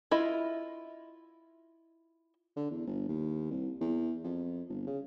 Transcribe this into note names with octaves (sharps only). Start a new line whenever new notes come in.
E4 F4 D#5 E5
D3
E2
G1
D#2
C2
E2
F2
G1
C#3